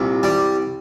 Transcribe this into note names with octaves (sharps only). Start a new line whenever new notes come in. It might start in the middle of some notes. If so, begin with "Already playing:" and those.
Already playing: C2 A#2
G3